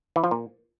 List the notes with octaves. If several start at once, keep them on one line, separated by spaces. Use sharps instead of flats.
E3
F3
A#2